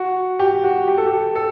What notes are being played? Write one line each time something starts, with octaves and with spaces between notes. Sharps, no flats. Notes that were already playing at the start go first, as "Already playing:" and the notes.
Already playing: F#4
G4
F#4
G4
A4
G4
A4